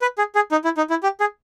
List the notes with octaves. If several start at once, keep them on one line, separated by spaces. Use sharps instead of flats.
B4
G#4
G#4
D#4
E4
D#4
E4
G4
G#4